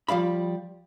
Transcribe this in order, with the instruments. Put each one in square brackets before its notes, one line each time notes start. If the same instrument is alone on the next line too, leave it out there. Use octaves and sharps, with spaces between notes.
[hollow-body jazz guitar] F3 G3 F5 B5